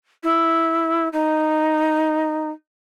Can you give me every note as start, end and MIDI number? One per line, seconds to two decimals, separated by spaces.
0.23 1.08 64
1.13 2.50 63